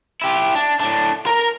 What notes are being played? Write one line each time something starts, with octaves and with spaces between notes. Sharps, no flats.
E4 G4
D4
A2 D4
A#4 A#5